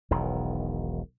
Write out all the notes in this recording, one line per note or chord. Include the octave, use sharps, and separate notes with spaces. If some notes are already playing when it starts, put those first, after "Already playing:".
E1 B1 D#3